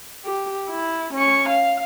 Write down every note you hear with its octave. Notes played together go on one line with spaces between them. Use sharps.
G4
E4
C#4 C#6
F5